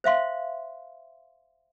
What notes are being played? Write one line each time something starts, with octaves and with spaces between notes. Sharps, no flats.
C5 E5 F5 C6